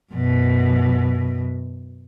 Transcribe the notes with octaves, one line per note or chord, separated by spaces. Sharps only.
F#2 B2